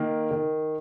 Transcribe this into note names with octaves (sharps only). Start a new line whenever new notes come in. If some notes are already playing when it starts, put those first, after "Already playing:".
Already playing: D#3 A#3
D#3